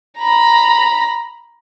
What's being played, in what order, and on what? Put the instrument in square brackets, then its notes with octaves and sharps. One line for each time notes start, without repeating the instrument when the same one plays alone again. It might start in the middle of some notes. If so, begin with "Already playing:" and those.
[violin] A#5 B5